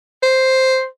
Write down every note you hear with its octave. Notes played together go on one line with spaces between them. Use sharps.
C5